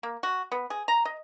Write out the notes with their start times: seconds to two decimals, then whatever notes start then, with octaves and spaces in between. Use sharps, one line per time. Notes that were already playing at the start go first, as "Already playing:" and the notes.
0.03 A#3
0.23 F#4
0.52 B3
0.70 G#4
0.88 A#5
1.05 D#5